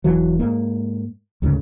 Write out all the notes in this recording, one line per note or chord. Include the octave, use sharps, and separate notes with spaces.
E1 E3 F#3
G#2 A#3
D2 G#2 C#3